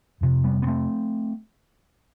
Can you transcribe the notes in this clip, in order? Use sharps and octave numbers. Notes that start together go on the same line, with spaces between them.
F2 C3
G3 B3
B3
A3 C4